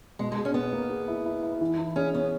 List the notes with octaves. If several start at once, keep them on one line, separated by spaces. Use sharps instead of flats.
B2 G#3
G#3
G#4
C#4
B2 B3
A#3
G#4
E4
E4
E4
E3
E3
C#4 G#4
B3 C#4